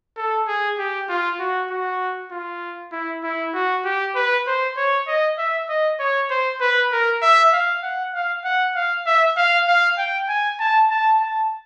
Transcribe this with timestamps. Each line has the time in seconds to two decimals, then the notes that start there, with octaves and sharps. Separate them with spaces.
0.17 A4
0.48 G#4
0.78 G4
1.09 F4
1.40 F#4
1.70 F#4
2.32 F4
2.92 E4
3.23 E4
3.54 F#4
3.85 G4
4.15 B4
4.47 C5
4.77 C#5
5.07 D#5
5.38 E5
5.69 D#5
6.00 C#5
6.30 C5
6.61 B4
6.92 A#4
7.22 E5
7.53 F5
7.83 F#5
8.14 F5
8.44 F#5
8.75 F5
9.06 E5
9.37 F5
9.68 F5
9.98 G5
10.29 G#5
10.60 A5
10.90 A5
11.21 A5